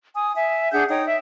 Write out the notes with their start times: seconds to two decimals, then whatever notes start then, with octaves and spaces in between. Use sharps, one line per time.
0.14 G#5 D#6
0.34 E5 G#5
0.72 D4 G#4 F#5 G6
0.89 D#4 C#5 G5 D#6
1.06 E5